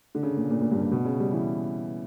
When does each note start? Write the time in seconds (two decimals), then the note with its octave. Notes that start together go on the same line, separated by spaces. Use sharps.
0.15 D3
0.23 C#3
0.37 A#2
0.50 A#2
0.61 A#2
0.71 G2
0.81 A#2
0.92 B2
1.05 C#3
1.20 G3
1.33 E3